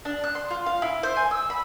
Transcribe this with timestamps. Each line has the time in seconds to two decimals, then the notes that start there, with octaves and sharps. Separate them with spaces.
0.05 D4
0.24 F#6
0.35 C6
0.50 F4
0.66 F5
0.82 E4
1.03 C5
1.17 G#5
1.31 E6
1.50 B5